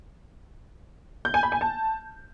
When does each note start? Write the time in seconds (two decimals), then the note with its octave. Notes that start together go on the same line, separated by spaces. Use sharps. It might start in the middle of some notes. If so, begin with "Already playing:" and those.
1.25 G6
1.34 G#5
1.43 B5
1.52 G#5
1.61 A5